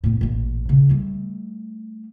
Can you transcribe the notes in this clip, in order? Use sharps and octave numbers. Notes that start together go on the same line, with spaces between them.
A2 B3
A1 A#2
C#3
G3 A3